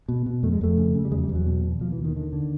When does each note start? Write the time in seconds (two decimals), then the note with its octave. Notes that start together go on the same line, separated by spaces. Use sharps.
0.09 B2
0.26 B2
0.43 F2 A3
0.53 G#3
0.61 F2 A3
0.77 C#3
0.95 C#3
1.05 G3
1.11 E2 G#3
1.18 F#3
1.24 G3
1.29 E2
1.35 F#3
1.47 B2
1.64 B2
1.81 D#2 F3
1.92 E3
1.99 D#2
2.04 D#3
2.16 D3 D#3
2.33 D3